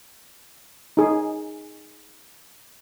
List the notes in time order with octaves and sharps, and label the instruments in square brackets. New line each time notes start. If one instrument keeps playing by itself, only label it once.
[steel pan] D#4 G#4